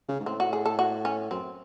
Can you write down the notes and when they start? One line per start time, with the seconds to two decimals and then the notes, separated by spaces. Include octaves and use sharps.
0.08 C#3
0.20 G#2
0.26 A2 C4
0.40 F#4
0.53 G#4
0.66 A4
0.79 F#4
1.05 C#4
1.31 F#2 C4